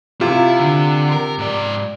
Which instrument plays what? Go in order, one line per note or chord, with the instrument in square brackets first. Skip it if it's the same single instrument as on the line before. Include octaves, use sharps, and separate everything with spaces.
[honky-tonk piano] C3 [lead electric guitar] E4 [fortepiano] F4
[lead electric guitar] D3
A#4
G#2 D5